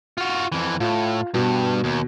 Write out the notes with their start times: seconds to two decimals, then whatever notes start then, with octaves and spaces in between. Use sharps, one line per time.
0.18 F4 F#4
0.52 F2 E3
0.80 A2 F4
1.34 G2 B2
1.84 D#2